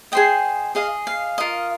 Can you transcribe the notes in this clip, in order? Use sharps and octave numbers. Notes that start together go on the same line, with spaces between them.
G#4 C5 D#5 G5
G#4 D#5 F5
F5
F4 A#4 D#5